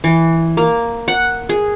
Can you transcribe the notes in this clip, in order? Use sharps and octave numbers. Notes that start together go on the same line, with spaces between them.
E3
A#3
F#5
G#4